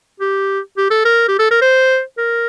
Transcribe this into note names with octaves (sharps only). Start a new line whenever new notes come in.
G4
G4
A4
A#4
G4
A4
A#4
C5
A#4